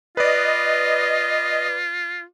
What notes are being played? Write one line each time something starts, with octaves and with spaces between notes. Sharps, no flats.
F4 B4 D5 D#5